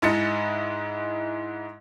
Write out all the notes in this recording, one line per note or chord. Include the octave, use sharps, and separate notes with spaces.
G#2 G#3 E4 D#5 A6 C#7